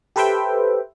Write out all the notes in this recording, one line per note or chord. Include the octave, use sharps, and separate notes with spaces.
G4 A4 B4 C5 E5 G5